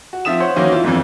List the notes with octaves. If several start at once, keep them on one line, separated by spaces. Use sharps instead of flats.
F#4
F3 C4 E5 D#6 E7
C5 C#5 F#5
D#3 E3 F#3 A#3 C#4 D#4
E4 F4
G1 F2 E3